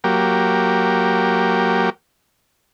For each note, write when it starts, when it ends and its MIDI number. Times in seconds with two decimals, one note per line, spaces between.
0.04 1.90 54
0.04 1.90 58
0.04 1.90 67